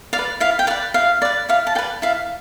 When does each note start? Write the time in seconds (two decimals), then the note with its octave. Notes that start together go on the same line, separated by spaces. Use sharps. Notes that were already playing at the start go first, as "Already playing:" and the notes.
0.13 D5 F5
0.19 B4
0.40 E4 F5
0.59 G5
0.67 B4 D5 F5
0.94 E4 F5
1.22 B4 D5
1.49 E4 F5
1.67 A5
1.75 D5 G5
1.78 B4
2.02 E4 F5